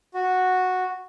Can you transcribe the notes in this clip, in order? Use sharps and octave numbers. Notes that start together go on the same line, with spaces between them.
F#4